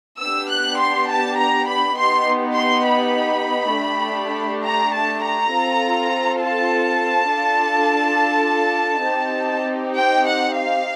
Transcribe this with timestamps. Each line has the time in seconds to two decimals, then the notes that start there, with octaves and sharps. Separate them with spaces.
0.20 B3 D4 G4 E6
0.50 F#6
0.80 C6
1.09 A5
1.39 A#5
1.69 B5
1.98 B3 D#4 G4 C6
2.57 C6
2.87 B5
3.75 A3 D4 G4
4.65 A#5
4.94 A5
5.24 A#5
5.54 C4 F4 A4
6.42 A5
7.31 D4 F4 A4
9.08 C4 D#4 G4
9.97 G5
10.27 F#5
10.56 F5